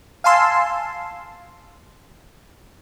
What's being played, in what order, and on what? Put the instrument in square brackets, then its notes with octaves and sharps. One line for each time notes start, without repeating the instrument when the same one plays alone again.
[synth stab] F5 G#5 A5 C6 E6